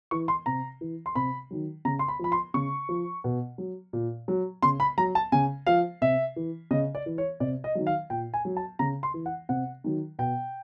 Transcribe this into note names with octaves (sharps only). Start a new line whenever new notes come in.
E3 C#6
C6
C3 A#5
E3
C6
C3 B5
D#3 F#3
C#3 A#5
C6
B5
F3 B5
C6
C#3 C#6
F3
B2
F#3
A#2
F#3
C#3 C6
B5
F#3 A#5
A5
C#3 G#5
F3 F5
C3 E5
E3
C#3 D#5
D5
E3
C#5
C3 D5
D#5
D#3 F#3
F5
A#2 G5
G#5
F#3
A5
C#3 A#5
C6
E3
F#5
C3 F#5
D#3 F#3
B2 G5